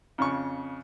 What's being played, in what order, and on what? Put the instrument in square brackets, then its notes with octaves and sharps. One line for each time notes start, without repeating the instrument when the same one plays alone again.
[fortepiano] F2 C#3 C#6